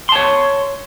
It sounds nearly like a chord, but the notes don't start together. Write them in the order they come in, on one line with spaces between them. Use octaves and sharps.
C6 A5 C#5